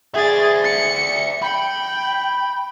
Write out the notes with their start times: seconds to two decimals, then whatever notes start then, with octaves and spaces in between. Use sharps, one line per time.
0.14 G#4 D5 E5 A6
0.64 C#7
1.42 G5 B5